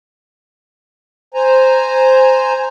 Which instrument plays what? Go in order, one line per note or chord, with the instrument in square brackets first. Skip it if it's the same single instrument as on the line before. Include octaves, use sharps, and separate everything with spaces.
[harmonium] C5 G#5 A#5